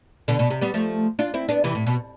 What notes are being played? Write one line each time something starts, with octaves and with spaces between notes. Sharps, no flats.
B2 D3
B2
C3
G3 B3
F3 A3
D4 F4
C4 E4
B3 D4
C3 E3
A2
B2